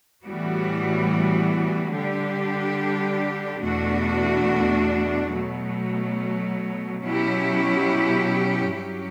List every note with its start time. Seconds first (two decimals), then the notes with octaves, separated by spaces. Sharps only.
0.23 A2 E3 G3 B3 F#4
1.93 D3 G3 D4 G4
3.63 E2 B2 A3 D4 F#4
5.33 B2 F#3 A3
7.02 B2 F#3 C#4 E4 G4
8.72 G2 F#3 C#4 G4